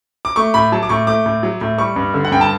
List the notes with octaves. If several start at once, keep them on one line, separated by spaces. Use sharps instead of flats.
D6
A3 C#6
A2 B5
F#3 A5
D6
A2 C#6
A3 D6
A2
F#3
A2
G3 C#6
G2
D3
F#5
G2 G5
A5